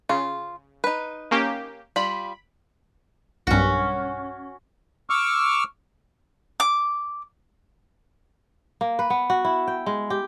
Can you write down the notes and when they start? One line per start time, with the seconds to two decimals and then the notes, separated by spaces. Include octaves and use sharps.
0.09 C#3 F4
0.84 D#4 B4
1.31 A#3 C#4 G4
1.96 G3 F4 B5
3.47 B1 G2 C#4 F#4
5.10 C#6 D6 E6 F6
6.60 D6
8.81 A#3
8.99 B4
9.10 B3
9.30 F#4
9.45 E4
9.67 G5
9.86 G#3
10.10 G4